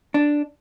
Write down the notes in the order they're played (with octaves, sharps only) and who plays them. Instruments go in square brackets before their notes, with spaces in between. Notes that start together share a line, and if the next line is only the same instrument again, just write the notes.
[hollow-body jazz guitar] D4